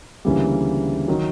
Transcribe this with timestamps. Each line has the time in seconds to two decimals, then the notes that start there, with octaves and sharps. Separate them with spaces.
0.25 D2 C#3 E3 G3 A#3
1.08 D#3 F#3